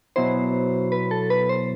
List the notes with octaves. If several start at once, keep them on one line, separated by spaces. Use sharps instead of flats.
B2 F#3 B3 E4 C5
B4
A4
B4
C5